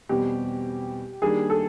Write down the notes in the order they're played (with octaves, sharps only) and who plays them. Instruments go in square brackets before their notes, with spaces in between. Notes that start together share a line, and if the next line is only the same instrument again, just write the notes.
[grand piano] E2 B2 G3 C4 [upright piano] G4
[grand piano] D#3 G3 A#3 D4 [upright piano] G#4
[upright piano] A4